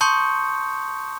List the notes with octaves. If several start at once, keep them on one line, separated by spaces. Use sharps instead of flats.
A5 C6 C#6 D#6 G6 C#7